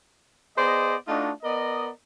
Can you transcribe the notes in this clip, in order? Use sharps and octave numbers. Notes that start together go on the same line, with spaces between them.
B3 G#4 C5 D5 D#5
A3 D4 D#4 F4 F#4 D#5
B3 A#4 D5 D#5